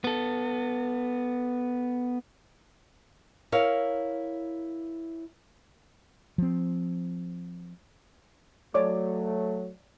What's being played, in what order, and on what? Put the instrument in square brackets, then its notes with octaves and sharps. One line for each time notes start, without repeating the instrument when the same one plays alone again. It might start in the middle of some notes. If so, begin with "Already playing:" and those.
[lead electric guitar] B3 A4
[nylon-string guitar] E4 A#4 C#5 F5
[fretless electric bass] F3 C4
[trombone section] F#3 A3 [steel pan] C#5 D5 D6